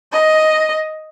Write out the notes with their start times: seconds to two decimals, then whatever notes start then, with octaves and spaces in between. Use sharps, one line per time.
0.12 D#5